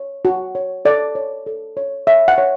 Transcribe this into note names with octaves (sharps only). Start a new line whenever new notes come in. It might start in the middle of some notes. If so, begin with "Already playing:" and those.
Already playing: C#5
F#4
C#5
A4 D5
C#5
A4
C#5
C#5 E5
F#5
C#5